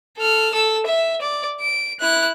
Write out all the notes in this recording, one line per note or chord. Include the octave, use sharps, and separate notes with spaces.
A4 F6
A4 E6
E5
D5
D7
E4 F#6